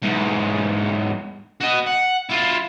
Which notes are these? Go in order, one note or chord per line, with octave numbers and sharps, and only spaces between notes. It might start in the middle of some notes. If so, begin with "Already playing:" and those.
E2 G#2
F#4 D#5
F#5
E4 F4